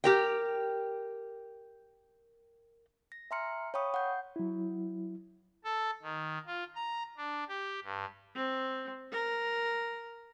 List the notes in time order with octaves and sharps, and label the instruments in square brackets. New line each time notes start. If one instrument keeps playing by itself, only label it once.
[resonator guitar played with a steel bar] G4 A#4 G5
[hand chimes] A#6
E5 G#5 A#5 C6 F6 C#7
C#5 F5 G5 B5 C#6 D#6
F#5 G6
[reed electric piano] F#3 E4
[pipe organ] A4
D#3
F4
A#5
D4
G4
G2
[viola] C4
A#4